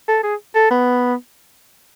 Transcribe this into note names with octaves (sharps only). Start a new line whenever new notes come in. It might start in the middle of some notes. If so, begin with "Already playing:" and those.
A4
G#4
A4
B3